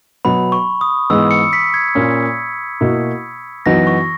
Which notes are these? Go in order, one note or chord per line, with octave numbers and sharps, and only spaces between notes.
B2 F#3 B3 B5
C#6
D#6
G#2 E3 G#3 B3 E6
C#7
B6
G#6
A#2 A#3 C#4
B2 A#3 E4
F#2 E3 B3 D#4 F#4 A#6
C#6